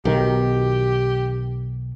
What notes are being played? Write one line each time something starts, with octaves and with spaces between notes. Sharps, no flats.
B1 D#3 G4